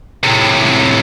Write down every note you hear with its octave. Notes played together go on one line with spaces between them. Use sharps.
A2 C3